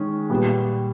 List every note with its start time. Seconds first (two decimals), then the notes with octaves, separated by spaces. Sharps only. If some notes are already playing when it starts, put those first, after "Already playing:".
Already playing: D#3 G#3 C#4
0.30 A#2 G3 B3